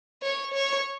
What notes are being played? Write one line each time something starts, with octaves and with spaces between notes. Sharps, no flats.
C#5
C#5